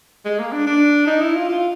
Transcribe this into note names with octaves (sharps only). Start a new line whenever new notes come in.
G#3
A#3
D4
D4
D#4
E4
F4
F4